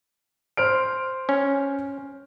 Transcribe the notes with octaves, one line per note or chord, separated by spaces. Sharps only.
C5 F6 D7
C#4